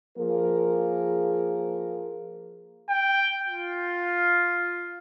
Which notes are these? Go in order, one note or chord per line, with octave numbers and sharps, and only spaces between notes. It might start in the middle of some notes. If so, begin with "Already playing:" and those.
F3 A#3 G#4 A#4
G5
F4